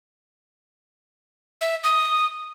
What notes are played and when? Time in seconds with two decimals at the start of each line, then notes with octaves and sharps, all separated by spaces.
1.61 E5
1.84 D#6